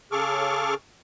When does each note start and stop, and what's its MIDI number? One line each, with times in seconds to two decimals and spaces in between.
0.12 0.74 49
0.12 0.74 68
0.12 0.74 69
0.12 0.74 85
0.12 0.74 86
0.12 0.74 89